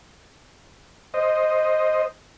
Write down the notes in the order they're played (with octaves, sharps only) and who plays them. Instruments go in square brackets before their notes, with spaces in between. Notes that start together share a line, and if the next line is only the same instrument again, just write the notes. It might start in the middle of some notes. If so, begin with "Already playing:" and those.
[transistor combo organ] C5 D#5